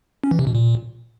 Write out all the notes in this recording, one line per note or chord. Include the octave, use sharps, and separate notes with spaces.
C#4
E3
C3
B2
A#2